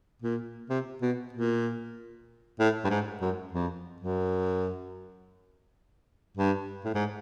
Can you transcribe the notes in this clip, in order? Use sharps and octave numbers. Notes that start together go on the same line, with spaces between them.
A#2
C3
B2
A#2
A2
G2
G#2
F#2
F2
F#2
G2
A2
G#2